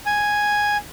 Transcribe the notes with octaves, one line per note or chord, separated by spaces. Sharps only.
G#5